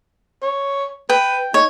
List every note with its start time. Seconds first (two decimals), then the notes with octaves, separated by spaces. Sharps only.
0.42 C#5
1.10 B4 G5
1.54 D#4 C#5